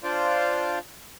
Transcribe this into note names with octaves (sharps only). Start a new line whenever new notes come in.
D4 F4 C5 D5 F5